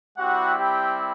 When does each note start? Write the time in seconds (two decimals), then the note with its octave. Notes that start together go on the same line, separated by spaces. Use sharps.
0.18 G3 C4 E4 F#4 G4 F#5
0.59 G4 G5